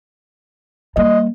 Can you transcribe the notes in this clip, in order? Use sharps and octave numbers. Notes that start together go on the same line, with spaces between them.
G3 A#3 D#5